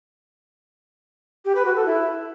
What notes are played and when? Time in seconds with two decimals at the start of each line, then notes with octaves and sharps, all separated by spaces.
1.45 G4
1.55 B4
1.65 F#4
1.75 A4
1.85 E4